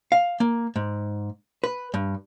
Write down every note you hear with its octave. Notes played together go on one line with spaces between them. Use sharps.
F5
A#3
G#2
B4
G2